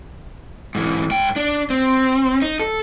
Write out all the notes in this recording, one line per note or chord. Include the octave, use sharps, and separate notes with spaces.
G#2 E3
G#2 G5
D4
C4
D#4
A4